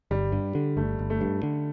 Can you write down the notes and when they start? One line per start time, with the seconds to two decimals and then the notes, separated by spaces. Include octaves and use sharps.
0.11 G1 G3
0.32 G2
0.55 D3
0.77 G1 A3
0.99 G1
1.10 A3
1.21 G2
1.43 D3